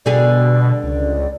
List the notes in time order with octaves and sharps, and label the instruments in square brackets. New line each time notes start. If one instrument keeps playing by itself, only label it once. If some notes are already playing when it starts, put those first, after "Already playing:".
[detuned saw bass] B2 [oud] D3 G3 G#4 [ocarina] D5
[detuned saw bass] C#2